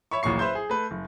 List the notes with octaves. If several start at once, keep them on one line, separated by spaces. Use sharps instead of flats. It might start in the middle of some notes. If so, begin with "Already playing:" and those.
C#5 E5 B5 C#6
D1 A1 A#2 F#3 C#6 C7
B4 C5 E5 C6 G6
G#4
A3 B4
F#1